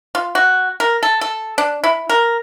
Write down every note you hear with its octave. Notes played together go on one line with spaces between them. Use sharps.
F4
F#4
A#4
A4
A4
D4
E4
A#4